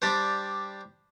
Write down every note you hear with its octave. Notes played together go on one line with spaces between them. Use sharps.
G3 D4 G4 C5